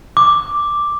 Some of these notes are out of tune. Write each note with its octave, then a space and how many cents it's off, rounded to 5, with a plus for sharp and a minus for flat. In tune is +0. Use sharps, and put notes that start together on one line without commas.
D6 +0